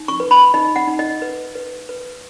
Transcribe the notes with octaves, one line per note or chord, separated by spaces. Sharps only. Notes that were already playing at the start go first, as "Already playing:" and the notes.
Already playing: D#4
C#6
B4
B5
D#4 D#5
F#5
D#4
D#5
B4
B4
B4